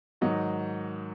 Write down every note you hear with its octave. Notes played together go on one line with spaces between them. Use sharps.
G#2 D#3 F#3 D#5